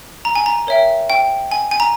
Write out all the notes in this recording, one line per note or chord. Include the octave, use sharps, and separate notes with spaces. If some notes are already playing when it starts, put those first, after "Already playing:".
A#5
G#5
A#5
A#4 C#5 E5 G5
G5
G#5
G#5
A#5